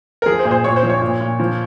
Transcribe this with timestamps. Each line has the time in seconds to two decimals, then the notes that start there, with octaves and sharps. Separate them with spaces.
0.22 A#4
0.26 F3 G#4
0.39 C5
0.45 A#2
0.51 C5
0.64 A#2 C#5
0.76 C5
0.83 F3
0.90 C#5
1.01 A#2
1.20 A#2
1.39 F3